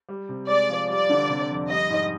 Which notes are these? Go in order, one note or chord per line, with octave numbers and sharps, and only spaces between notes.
G3
C3
G#3 D5
F3
G3 D5
D3
C3
F2
G3 D#5
G#2